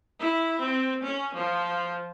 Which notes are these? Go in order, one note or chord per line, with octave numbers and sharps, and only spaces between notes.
E4
C4
C#4
F3